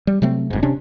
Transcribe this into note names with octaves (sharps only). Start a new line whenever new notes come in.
G3
C3 F#3 A3 C4
F1 G#2
C3 C#4 D4